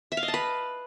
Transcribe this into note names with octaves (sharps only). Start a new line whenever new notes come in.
E5
F5
D#5
A5
B4